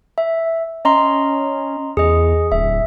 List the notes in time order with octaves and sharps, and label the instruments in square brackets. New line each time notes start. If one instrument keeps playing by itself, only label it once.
[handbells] E5
[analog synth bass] C#4 [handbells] D#5 A#5 C6
[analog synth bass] E2 [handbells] G#4 D#5
[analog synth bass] D1 [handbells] E5